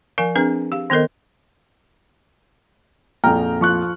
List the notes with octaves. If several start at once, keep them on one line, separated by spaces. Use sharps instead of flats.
F3 A#4 F5 G#5
C4 D4 G#4 B4
G4 F5
D#3 B3 A4 A#4 D#5
A#1 F2 G5 A#5 F6
F3 C#6 F#6